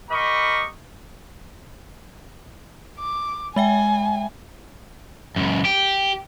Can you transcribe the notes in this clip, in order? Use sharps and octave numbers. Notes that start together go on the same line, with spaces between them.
G4 A#4 D#5 B5 C#6
D6
G#3 E5 G5 G#5
C#2 F#2
G4